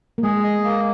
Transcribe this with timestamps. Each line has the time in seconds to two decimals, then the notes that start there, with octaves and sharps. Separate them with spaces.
0.18 A#3
0.23 G#3 G#4
0.44 D#5
0.64 A#3